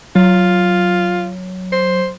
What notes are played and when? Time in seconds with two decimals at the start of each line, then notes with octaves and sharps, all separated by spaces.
0.16 F#3 F4
1.72 C5